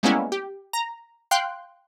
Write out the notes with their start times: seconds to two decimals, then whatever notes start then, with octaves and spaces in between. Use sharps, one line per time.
0.03 G3 G#3 A#3 B3 C#4 E4
0.32 G4
0.73 A#5
1.31 F5 G5 C6 F#6